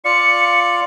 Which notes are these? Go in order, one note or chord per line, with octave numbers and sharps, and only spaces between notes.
F4 D5 F5 C#7